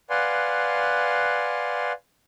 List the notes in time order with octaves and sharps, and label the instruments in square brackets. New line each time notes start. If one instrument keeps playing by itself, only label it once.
[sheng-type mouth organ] B4 D5 F5 F#5 G#5 C6